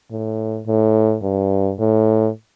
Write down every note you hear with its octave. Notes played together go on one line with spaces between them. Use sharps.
A2
A2
G2
A2